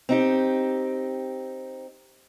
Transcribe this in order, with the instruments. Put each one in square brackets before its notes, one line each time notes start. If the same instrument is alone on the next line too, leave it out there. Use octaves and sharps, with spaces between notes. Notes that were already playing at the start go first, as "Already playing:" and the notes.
[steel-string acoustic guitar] C4 D#4 G4